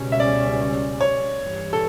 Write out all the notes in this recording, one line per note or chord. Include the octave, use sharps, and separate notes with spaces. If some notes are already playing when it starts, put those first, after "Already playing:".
Already playing: C#2 B2 G3 C#4
E5
D5
C#5
G2 E3 G3
A4